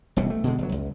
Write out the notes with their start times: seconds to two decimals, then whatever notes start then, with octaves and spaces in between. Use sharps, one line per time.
0.16 E1 C2 B2
0.30 A3
0.44 B2 D3 G#3
0.58 G1 F#3
0.72 C#2